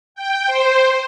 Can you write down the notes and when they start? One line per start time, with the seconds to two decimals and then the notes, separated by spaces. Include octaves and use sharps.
0.15 G5
0.47 C5